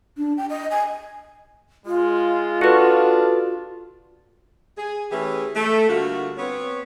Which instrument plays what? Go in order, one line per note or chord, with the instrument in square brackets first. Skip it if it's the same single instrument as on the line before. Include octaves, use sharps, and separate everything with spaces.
[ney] D4
G5
D#5
G#5
[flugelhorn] G#3 [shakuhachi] F4
[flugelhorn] D4 [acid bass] F#4 [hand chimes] A4 B4
[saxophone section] G#4
E3 A3 C#4 E4 G4 G#4
A3
D3 G3 A#3 F4 F#4
B3 C4 C#5